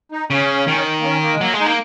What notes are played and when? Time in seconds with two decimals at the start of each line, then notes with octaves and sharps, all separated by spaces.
0.12 D#4
0.30 C#3 C#4
0.68 D#3
1.00 A#3
1.04 C#4
1.23 A#3
1.33 G#3
1.41 F#3 A#3
1.53 G#3
1.60 D#4
1.66 A#3